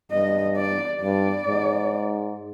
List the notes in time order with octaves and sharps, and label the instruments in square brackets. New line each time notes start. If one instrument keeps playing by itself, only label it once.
[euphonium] G2 [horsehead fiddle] D#5
[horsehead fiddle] D5
[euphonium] G2 [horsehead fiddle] D5
[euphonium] G#2